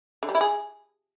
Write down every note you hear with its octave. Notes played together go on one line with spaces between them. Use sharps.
D3
G3
E4
G#4